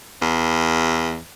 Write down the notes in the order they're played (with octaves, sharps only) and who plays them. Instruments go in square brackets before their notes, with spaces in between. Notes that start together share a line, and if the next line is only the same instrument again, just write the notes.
[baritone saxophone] E2